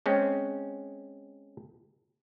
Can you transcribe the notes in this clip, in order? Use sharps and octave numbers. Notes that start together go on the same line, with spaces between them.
G#3 C4 C#4